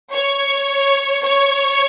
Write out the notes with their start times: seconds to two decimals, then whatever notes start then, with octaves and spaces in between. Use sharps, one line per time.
0.12 C#5
1.23 C#5